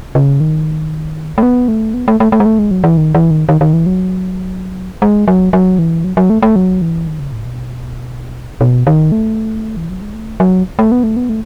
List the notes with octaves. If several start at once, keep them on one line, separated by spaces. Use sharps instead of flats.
C#3
D#3
A3
B3
A3
B3
A3
A3
A3
G#3
A3
G#3
F#3
E3
D#3
E3
D#3
D#3
D#3
E3
F#3
G#3
F#3
F#3
E3
F#3
F#3
A3
A3
F#3
E3
D#3
C#3
A2
B2
B2
D#3
A3
E3
F#3
G#3
A3
F#3
A3
B3
A3
B3
A3